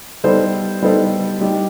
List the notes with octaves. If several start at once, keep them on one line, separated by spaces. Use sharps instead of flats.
G3 B3 D#4 A4 C5
G3 B3 D#4 A4 C5
G3 D#4 G4